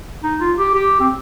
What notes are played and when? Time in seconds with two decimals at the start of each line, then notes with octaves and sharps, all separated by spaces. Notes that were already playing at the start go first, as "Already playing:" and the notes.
0.23 D#4
0.40 F4
0.58 G4
0.74 G4
1.00 C4